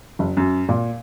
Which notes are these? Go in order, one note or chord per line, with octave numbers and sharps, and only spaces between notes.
F#1
F#2
A#2